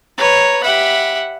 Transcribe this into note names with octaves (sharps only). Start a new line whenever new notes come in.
B4 C#5 A#5
G4 E5 F#5 B5